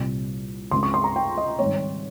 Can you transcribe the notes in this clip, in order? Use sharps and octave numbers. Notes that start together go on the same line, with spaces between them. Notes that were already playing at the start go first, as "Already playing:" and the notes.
Already playing: C2 A#2 G3 C4
C#2 C#3 G#3 C4 C6
C#6
C6
A#5
G5
D#5
G#2 D#3 G3 C4 C#5